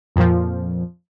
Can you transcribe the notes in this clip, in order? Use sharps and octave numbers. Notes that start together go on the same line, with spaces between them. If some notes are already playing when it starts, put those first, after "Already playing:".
F2 A#2 F3